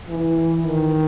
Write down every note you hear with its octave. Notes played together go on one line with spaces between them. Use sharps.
E3
D#3